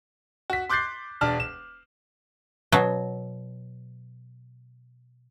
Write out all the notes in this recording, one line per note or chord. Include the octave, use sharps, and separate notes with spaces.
F#4 B6
C6 D6 F#6 G6 A6 C7
E1 D4 A5 F6
E7
B2 F#3